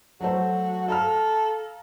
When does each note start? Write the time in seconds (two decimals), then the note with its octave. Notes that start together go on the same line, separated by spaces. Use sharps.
0.20 F#3 A3 F#4 C5
0.88 A4 F5 A#5 F6